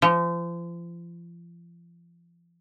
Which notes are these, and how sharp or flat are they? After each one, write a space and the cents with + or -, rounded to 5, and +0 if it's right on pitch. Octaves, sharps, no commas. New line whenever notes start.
F3 -35